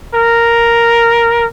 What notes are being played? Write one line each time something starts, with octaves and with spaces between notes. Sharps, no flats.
A#4